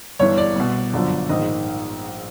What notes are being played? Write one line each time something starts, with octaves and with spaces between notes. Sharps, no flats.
G1 G2 E3 C#5
D5
C2 B2
G1 F#2 D3 F3
A#1 G#2 D#3 D#5